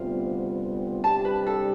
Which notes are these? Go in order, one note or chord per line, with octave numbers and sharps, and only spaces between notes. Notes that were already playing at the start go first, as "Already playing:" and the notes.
Already playing: D2 C3 G3 B3 F4 F5
C3 G3 D4 G4 A5
B4
A4